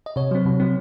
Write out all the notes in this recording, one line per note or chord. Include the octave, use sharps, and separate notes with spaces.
D#5
C3 C#5
F#3 C4
C3
F#3 C4